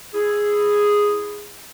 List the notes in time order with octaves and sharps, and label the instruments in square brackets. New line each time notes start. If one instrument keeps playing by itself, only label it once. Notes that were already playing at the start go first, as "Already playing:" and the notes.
[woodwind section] E4 G#4